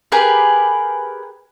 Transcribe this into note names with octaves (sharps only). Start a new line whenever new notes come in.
G4 G#4 A#4 B4